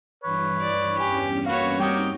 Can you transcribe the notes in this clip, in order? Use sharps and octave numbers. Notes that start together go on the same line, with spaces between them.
G2 E3 B4 C#5
D5
E2 G2 C#4 G4 G#5
A#3 F#4 B4 C#5 F5
G3 C4 D#4 G4 A#4 G5 D#6